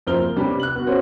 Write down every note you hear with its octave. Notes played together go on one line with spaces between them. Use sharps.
F#1 F3 C4 A#5 F6 G7
A#3
C3 G3 B3 C#4 D4
F#6 F#7
B3 F#4
B3 C#4 F#4 C5 C#5